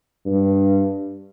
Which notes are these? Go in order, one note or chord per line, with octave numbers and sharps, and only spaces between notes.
G2